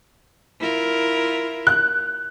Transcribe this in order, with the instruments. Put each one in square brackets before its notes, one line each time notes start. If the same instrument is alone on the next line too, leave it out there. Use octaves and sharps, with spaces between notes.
[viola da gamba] E4 F4 A#4
[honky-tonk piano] F#6